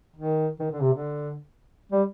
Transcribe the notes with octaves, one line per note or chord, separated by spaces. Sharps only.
D#3
D#3
D3
C3
D3
G3